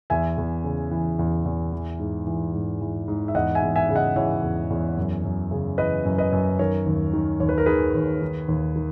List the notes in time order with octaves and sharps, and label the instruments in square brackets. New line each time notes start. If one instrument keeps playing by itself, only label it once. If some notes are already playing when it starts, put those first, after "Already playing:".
[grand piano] E2 E5 G#5
E2
C#3
E3
E2
E2
E3
G#2
E3
G#2
E3
G#2
E5
E2 D#5 F#5
E5 G#5
E2
E5 G#5
C#3
D#5 F#5
E3 C#5 E5
E2
E2
F#2
F#2
C#3
E3 B4 D#5
F#2
B4 D#5
F#2
D#3 A#4 C#5
D#2
D#3
D#2 C#5
B4
A#4
D#3 G#4 B4
D#2
D#3
D#2
D#3